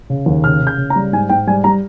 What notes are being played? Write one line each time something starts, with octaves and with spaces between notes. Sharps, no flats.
C#3
D#2
C#3 F6
C#3
G6
C#3
A#5
G3
G#2 G#5
G#2 G5
G3 G#5
G3 A#5